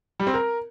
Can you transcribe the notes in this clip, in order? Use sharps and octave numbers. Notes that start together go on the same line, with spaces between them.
G3
C4
A#4